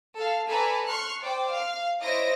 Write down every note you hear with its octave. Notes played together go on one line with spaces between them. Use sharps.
A4 F5
A4 B4 D5 G#5 A#5 B5
C6 C#6 F6 F#6 C#7
C5 D5 G5 D6
F5
E4 C5 C#5 D#5 A#6 D7